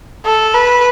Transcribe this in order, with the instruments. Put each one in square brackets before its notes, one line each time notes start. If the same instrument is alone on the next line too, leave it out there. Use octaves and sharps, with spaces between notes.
[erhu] A4
B4